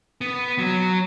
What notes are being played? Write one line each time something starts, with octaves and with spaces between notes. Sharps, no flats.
B3
F#3